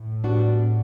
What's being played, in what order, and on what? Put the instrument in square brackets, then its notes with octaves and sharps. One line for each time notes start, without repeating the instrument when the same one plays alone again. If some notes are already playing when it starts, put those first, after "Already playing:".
Already playing: [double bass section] A2
[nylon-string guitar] G3 B3 D4 F#4